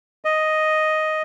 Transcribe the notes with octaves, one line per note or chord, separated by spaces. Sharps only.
D#5